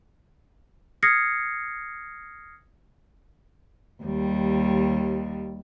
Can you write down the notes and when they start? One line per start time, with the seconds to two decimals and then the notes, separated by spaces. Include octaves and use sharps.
1.03 D#6 F6 G#6 A#6 C7 C#7
4.03 D#2 G3